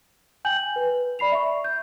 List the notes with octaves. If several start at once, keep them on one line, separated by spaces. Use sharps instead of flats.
G5 G#5 G6 F#7
B4
D5 B5 C7 F7
E5 C#6
G6